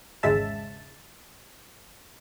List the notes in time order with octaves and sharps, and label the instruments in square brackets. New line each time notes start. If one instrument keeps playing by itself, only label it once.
[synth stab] G#1 E2 C#3 G#3 E5 A5